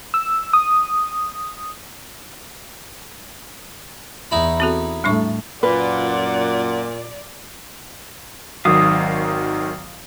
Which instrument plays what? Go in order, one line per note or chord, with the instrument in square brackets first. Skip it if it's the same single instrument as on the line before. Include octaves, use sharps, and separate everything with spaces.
[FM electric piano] E6
D#6
[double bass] E2 [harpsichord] D#4 E4 B5
[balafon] C4 F#4 A4
[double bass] A2 A3 [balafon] G3 D4 C#6
[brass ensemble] F#2 F4 F#5 [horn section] A#2 [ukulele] B4 [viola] D5
[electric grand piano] G#1 D#3 F#3 [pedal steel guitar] F5 D#6